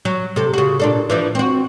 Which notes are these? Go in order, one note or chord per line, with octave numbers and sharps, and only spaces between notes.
F#3
C3 A4
C#3 F#4
A#2 D4 A4
E3 F3 D4
C4 F#4